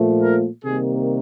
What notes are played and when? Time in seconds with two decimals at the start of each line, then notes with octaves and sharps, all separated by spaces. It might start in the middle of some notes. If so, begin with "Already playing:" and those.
Already playing: A#2 F3 A3
0.21 A#4
0.64 C3 D#3 G3 A#3 G#4